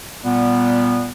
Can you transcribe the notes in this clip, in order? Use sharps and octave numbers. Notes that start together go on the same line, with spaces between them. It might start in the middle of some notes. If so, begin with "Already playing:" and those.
A#2 G3 B3